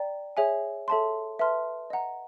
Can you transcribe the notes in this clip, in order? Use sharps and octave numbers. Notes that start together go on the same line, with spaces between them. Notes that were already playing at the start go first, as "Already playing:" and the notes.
Already playing: D5 G5 A#5
G#4 C#5 E5 G#5
A4 C#5 E5 A5 C6
B4 E5 A5 C6 F6
D#5 F#5 A#5